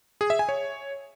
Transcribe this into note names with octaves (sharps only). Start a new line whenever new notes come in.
G#4
E5
G#5
C#5